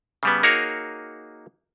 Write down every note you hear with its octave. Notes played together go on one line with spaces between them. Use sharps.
C#3 G3 B3
A#3 D#4 F#4 G#4 A#4 C#5